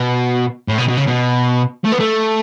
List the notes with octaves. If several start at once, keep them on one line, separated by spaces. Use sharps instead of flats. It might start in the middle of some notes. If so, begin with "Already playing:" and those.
Already playing: B2
A2
B2
B2
C#3
B2
A3
B3
A3